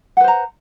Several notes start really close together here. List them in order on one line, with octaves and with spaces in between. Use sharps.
F#5 B4 C5 A#5